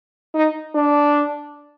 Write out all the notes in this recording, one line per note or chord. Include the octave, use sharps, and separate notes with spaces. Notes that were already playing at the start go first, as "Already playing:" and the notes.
D#4
D4